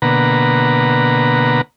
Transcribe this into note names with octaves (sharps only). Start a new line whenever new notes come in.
B2 D3 A#3 B4 F#5 A#5